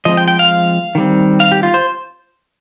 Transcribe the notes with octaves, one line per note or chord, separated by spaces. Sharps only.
F3 G#3 C4 D#5
G5
G5
F5
D#3 G3 C4
F5
G4
F4
C5